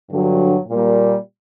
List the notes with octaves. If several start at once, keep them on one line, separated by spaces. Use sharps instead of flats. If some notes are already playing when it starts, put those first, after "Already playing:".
G2 D3 F#3
A#2 G3 A#3